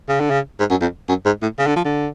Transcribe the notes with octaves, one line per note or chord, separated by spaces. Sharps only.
C#3
D3
C#3
G#2
F#2
F2
F#2
G#2
A2
C#3
D3
F3
D3